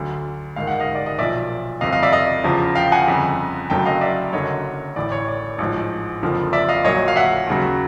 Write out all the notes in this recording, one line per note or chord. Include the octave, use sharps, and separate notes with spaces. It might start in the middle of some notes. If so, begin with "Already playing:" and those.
Already playing: D2 D3 F#3
A#1 G#2 D#3 F5
F#5
D#5 F5
D5
D#5
B1 A#2 F3 D5 E5
G1 F2 C3 D#5 F5
D#5 F5
D5 E5
D#5 F5
E2 C#3 F3
F5 G5
F#5 G#5
G1 F2 C#3
F#1 F#2 D3 F#3 G5 A5
D#5 F5
D5 E5
F#1 F#2 D3 F#3 C#5 D#5
A1 A2 E3 D5
C#5
D5
A1 G#2 F3
F#1 F2 D3 F3
D5 E5
D#5 F5
A#1 A#2 F#3 C#5 D#5
F5
E5 F#5
D#2 C#3 F#3